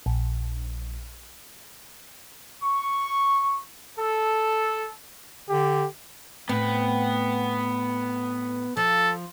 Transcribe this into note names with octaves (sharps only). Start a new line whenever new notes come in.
A#1
C#6
A4
D3 G4
A2 B3 C4 B4
F3 A4